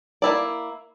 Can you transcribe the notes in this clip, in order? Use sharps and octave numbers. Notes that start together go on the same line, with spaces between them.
A#3 E4 D5